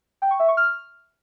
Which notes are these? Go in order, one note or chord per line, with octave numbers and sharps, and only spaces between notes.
G5
C#6
E5
C#6
F6